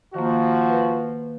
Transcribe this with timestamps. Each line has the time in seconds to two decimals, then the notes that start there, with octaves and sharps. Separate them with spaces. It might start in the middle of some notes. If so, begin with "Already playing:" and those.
0.14 D#3 F3 A#3 F#4
0.69 B4